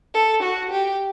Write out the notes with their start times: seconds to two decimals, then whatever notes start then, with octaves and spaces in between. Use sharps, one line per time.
0.14 A4
0.43 F#4
0.71 G4